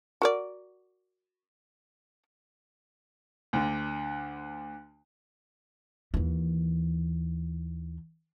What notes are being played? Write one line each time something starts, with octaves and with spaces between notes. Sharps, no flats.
F#4 A#4 D5
D2 D3
D#2 E3